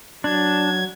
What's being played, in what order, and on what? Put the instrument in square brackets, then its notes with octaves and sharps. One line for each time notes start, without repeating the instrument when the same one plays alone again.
[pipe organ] F#3 G#6 [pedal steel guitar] D4